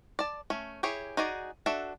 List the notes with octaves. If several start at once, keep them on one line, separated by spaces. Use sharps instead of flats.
D5 A5
A3 C#4
E4 G4 G#4 C#5
D#4 F#4 G#4 D5
D4 F#4 A4 E5